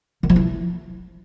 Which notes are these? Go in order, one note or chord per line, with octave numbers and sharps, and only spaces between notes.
D#3
F3
E4